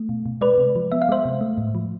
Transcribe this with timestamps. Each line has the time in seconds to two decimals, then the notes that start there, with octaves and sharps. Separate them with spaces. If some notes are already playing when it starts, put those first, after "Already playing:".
Already playing: A3
0.09 B2
0.26 B2
0.41 G#3 B4 D5
0.58 C3
0.76 F3
0.92 B3 E5
1.02 F5
1.09 G#3 C5 E5
1.25 C3
1.41 A3
1.58 A2
1.75 F3